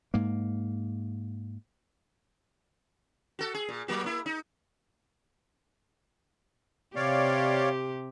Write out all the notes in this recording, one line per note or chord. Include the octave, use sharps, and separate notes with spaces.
G#2 A#3
F#4 A4
G#4
A#2
F#3 A#3 F#4
A#3 E4
D#4
C3 G4 C#5 D5 F5